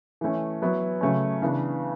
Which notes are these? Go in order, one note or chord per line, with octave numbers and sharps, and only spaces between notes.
E3 A3 C#4
F#3 B3 E4
C#3 F#3 A3 C#4
C#3 E3 B3 D4